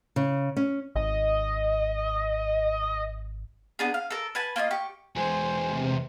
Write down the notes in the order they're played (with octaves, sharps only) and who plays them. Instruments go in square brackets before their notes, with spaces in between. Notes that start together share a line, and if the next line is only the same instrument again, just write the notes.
[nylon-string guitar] C#3
C#4
[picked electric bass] G#1 [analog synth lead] D#5
[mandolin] B3 D4 G#4
F5
A4 A#4
B4 G#5 A5
A#3 F4 D5 D#5
G4 C#6
[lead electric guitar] E2 G#3 [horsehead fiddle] C5 [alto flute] G#5
[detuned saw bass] C3